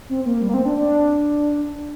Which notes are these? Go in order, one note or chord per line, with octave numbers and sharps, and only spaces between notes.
C4
A#3
G3
A#3
C4
D4
D4